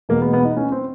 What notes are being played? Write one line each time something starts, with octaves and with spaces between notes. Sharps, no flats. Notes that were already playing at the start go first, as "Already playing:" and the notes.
E2 B2 G#3 A#3
B3
B3
D#4
C#4
C4